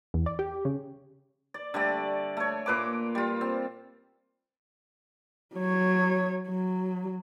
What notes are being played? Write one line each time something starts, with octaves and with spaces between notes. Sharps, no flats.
E2
D5
G4
C#3
D5
D3 G3 A3 D5
A3 C#5
A#2 B4 D6
G3 F4
C4
F#3 C#5
F#3